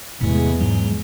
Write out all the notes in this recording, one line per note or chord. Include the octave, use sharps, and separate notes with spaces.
E2 A2 C3 G#3 A3 E4
G#2 F#3